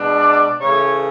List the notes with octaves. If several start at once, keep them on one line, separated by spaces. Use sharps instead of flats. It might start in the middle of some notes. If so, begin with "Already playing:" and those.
Already playing: B2 G#3 D4
D5
C#3 E3 A3 C#5